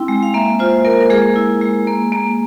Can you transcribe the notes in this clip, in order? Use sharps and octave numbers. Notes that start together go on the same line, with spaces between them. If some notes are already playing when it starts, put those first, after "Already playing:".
Already playing: C4 E4 G5
G#3
F5
A#3 E5
F4 C5
A#3 A#4
A#4
G#3 G#4
E4
G#3
A#3
A#3